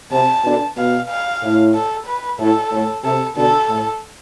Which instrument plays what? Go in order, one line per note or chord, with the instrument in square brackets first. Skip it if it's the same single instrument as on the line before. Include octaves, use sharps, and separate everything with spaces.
[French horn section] C3 [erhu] A5
[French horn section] B2 D3
[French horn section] B2 [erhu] F5
[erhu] F5
[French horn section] A2
[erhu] A4
B4
[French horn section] A2 [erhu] A4
[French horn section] A2
[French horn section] C3 [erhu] A4
[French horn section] B2 D3 [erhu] A4
[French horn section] A2